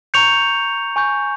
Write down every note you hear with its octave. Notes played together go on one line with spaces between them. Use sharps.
A#5 C#6 G6 C#7 F7
G#5 C#6 G6